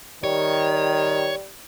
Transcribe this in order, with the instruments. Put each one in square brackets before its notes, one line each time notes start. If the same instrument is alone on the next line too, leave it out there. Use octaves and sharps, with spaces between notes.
[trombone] D#3 [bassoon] G3 [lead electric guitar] C#5